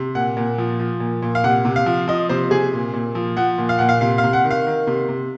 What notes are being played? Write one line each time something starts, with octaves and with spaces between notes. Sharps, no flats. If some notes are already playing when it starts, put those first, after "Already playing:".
Already playing: C3
A#2 F#5
A#2
F3
F3
A#2
A#2
F5
C3 F#5
C3
F5
F3
F3 D#5
C3 C5
C3 G#4
A#2
A#2
F3
F3 F#5
A#2
F5
A#2 F#5
F5
C3 F5
F5
C3
F#5
D#3
F5
D#3
C3
C3